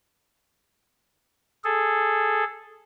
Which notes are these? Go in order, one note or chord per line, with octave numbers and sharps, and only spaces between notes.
G#4 A4